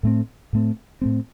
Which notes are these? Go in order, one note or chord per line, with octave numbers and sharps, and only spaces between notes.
A2 A3 C4
A2 A3 C4
A2 A3 C4